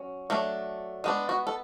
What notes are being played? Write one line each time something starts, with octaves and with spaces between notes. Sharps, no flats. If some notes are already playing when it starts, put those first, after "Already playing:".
Already playing: F#3 C#4
F#3 A3 D4
G#3 B3 D4
F#4
A4